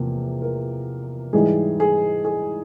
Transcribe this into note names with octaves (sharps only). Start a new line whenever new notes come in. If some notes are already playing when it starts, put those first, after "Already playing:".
Already playing: E2 C3 F3 A#3
A#4
G#2 E3 G3 G#4
G#4
G#4